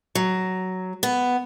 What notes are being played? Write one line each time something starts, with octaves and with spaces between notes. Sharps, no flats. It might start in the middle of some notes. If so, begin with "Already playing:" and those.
F#3
B3